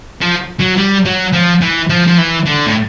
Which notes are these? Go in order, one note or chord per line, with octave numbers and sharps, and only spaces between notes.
F3
F#3
G3
F#3
F3
E3
F3
F3
E3
D3
A2